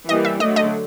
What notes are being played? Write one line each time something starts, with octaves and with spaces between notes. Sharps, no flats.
E3 G3 A#3 D#5
E5
D3 F#3 A3 D4 D#5
D#5